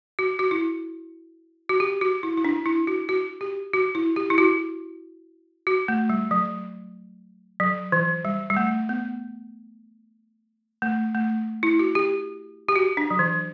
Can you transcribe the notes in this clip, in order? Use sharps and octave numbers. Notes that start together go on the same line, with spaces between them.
F#4
F#4
E4
F#4
G4
F#4
E4
E4
D4
E4
F#4
F#4
G4
F#4
E4
G4
E4
F#4
F#4
A3
G3
F#3
F#3
E3
G3
G3
A3
B3
A3
A3
E4
F#4
G4
G4
F#4
D4
F#3
E3